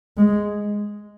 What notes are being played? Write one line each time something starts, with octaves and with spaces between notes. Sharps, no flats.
G#3